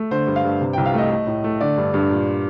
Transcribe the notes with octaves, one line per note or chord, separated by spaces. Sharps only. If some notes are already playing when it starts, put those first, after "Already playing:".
Already playing: A3
D3 C5
G2
F5
G2
C3
C2 G5
F5
A3 D#5
A3
A2
A3
D3 D5
G2
G2
A#2